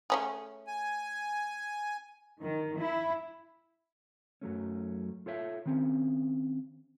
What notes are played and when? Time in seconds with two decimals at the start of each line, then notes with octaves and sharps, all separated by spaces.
0.10 A3 C#4 G#4
0.67 G#5
2.41 D#3
2.78 E4
4.41 F#2 F#3 A3 C#4
5.26 F4 A4 C#5 E5
5.66 D#3 C4 C#4